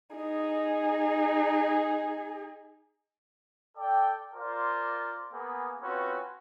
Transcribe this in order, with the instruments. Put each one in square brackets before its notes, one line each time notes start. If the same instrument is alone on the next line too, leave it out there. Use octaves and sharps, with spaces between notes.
[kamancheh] D#4 G#4
[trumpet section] A4 D5 G5
F4 A#4 C5 D5
A#3 B3 G#4
C4 C#4 F4 F#4 B4